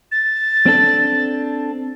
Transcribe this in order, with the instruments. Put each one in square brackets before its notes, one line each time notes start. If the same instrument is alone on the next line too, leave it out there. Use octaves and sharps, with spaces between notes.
[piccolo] A6
[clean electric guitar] C4 D4 A4